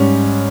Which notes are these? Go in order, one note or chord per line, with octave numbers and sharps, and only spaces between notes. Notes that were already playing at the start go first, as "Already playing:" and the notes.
Already playing: G#2 G3 C#4